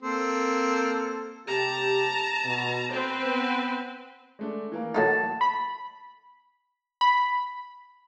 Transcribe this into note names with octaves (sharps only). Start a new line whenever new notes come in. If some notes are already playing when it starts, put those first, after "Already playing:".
A#3 C4 A4
C3 G4 A5 A#5
B2
C4 B4 C5
B3
G#3 A3 D4
E3 A#3 A#4
F#3 A3 D#4 A5
B5
B5